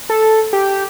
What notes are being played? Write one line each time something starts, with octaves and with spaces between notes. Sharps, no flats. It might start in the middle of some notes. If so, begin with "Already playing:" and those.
A4
G4